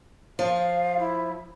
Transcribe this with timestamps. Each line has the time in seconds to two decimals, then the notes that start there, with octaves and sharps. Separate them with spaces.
0.39 F3 F5
0.99 E4